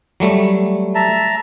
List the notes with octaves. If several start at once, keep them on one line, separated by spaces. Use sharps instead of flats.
F#3 G3 A3
E5 A5 A#5